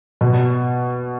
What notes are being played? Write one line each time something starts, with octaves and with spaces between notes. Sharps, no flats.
B2